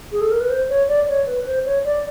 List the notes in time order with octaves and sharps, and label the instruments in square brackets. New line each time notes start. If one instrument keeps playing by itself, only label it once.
[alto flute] G#4
A4
A#4
B4
C5
C#5
D5
C#5
B4
C5
C#5
D5